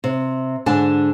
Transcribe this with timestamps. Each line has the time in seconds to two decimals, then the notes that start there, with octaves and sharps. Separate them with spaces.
0.04 C3
0.66 G#2 D3 D4 G#5 A5